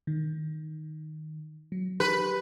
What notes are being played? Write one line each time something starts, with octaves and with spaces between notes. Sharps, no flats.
D#3
F#3
G4 B4